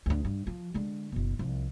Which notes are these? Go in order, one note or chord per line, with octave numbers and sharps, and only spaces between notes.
D2 D3
G2
F3
D3 G#3
F#1 B2
C2 F3